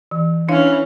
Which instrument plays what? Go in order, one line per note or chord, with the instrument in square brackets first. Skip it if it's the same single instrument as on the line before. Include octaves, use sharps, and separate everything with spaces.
[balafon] E3
[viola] E3 C#4 [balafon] D4 C#5 F5